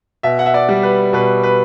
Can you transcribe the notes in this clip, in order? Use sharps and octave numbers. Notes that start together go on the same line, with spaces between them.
B2 E5
F#5
E5
D5
G3
B4
B2 B4
B4